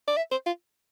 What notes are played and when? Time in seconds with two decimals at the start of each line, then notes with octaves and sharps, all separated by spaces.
0.08 D5
0.17 E5
0.31 C5
0.46 F4